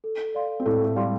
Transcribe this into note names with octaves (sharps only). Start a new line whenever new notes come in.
A4
D5 F5 C6
C4
A2 A3 A4
A3
G3 D5 F5 C6